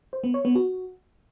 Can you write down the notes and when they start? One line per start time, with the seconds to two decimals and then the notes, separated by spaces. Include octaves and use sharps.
0.13 C5
0.24 B3
0.34 C#5
0.45 B3
0.55 F#4